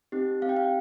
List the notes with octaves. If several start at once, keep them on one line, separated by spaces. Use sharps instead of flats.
C4 D#4 G4
C4 D#4 G4 F5
G5
F5